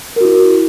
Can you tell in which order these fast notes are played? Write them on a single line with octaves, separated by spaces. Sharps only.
A#4 F#4 E4